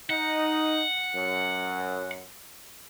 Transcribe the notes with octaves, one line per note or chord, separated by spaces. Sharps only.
D#4 F#5
F#2